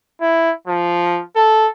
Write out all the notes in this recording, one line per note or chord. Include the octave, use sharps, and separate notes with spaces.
E4
F3
A4